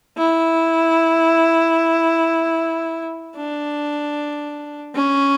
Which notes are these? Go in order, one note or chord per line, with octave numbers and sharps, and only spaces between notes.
E4
D4
C#4